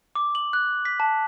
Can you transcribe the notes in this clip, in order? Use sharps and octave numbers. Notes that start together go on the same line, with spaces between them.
D6
F#7
F#6
B6
A5